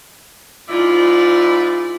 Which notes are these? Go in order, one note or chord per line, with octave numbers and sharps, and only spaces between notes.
G#2 E4 F4 D5